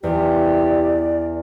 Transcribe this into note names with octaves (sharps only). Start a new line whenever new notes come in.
E2 G4 D5